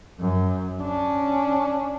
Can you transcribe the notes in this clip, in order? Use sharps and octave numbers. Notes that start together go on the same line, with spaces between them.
F#2
C#4 D4